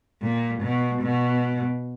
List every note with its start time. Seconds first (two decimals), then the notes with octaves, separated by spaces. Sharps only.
0.22 A#2
0.62 B2
1.03 B2